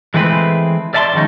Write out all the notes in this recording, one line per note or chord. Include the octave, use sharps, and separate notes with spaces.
E3 G#3 A3 C4 G#4 B4
D5 E5 A5 B5 C6
D#3 F3 G#3 C#4 D#4